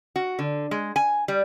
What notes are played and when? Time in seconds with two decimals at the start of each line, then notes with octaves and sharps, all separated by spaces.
0.16 F#4
0.39 D3
0.71 G#3
0.96 G#5
1.28 G3